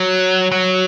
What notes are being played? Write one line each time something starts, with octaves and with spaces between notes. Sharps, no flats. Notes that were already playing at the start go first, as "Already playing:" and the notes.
Already playing: F#3
F#3